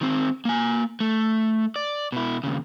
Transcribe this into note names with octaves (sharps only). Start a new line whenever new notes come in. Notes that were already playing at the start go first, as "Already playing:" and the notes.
D#3 C4
A#3 G#5
A3
D5
B2 E4
D#2 C#3